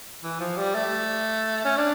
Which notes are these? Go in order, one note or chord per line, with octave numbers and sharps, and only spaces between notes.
E3
F3
G3
A3
C#4
D4